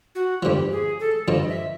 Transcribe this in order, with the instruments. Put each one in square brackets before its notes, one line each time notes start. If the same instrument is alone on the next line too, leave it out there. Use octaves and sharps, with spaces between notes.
[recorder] F#4
[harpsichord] G2 D3 F3 [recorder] G4
[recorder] G#4
A4
[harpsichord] G2 D3 F3 [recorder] D#5
[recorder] E5